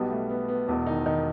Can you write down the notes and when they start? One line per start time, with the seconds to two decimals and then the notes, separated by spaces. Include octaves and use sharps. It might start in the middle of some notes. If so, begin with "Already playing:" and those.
Already playing: B1 B2 G3 B3
0.10 A3
0.29 B3
0.48 B3
0.68 E1 E2 B2
0.87 D#3 D#4
1.06 D#3 D#4